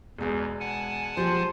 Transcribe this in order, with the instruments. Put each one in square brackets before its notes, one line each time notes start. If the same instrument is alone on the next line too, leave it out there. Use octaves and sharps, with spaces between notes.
[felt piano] E1 G#3 B3 [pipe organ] E2
[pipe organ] F#5 G#5 A5
[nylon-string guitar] F3 G4 [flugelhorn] C5